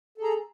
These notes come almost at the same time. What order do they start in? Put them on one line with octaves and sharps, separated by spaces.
A4 G#4 A#5